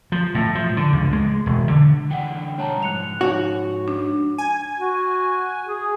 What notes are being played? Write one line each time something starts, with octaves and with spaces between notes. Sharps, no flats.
F3
A2
F3
D3
C#2
G#3
E1
D3
D3 E3 D4 F#5 G5
B2 G3 C#5 F#5 A5 A#5
G#2 F3 F#6 C#7 F7
D#4 F#4 C#5
D4
G#5
F#4
G#4